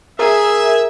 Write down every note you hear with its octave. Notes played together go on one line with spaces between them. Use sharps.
G#4 A#4 E5 G#5